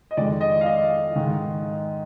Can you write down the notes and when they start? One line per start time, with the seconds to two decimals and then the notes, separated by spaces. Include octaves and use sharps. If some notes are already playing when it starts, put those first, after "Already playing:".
0.11 D#5
0.17 F2 D#3 G#3 D5
0.41 D#5
0.61 F5
0.66 D#5
1.15 G#2 D#3 G#3